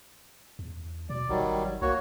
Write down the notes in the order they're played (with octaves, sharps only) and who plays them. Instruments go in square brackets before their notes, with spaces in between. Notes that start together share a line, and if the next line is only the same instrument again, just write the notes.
[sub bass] E2
[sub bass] B2 [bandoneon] D5
[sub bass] G#1 [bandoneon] D#3 F#3 G3
[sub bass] B1 [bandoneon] A#3 F#4 C#5